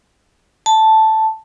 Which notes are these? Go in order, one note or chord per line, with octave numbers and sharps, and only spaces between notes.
A5